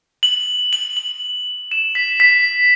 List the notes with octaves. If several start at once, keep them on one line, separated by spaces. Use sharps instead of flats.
F#7
F#7
F#7
E7
B6
B6